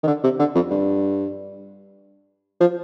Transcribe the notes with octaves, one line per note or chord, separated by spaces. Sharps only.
D#3
D3
C3
D3
F2
G2
F3